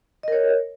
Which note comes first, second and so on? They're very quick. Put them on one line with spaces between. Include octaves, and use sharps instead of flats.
D#5 A#4 C#5